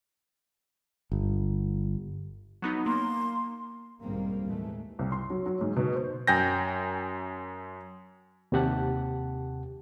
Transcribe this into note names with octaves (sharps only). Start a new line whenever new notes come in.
G1
F#3 B3 D#4
A#3 C6
B1 G#2 D#3 G3 A#3 C4
D#2 A2 E3 G#3 A3
C2
C6
F#3
F#3
G#2
B2
C5
F#2 G5 G#5 G6 A#6
D#2 C3 G4 F#5 A5